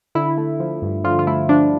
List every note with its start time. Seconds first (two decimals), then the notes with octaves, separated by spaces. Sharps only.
0.15 D3 E4
0.38 A3
0.60 F3
0.82 G2
1.04 D3 F3 F4
1.19 F4
1.27 A3 E4
1.49 F3 D4